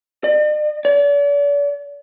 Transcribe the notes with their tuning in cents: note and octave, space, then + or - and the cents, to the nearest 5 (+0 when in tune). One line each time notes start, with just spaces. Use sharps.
D5 +45
D5 -40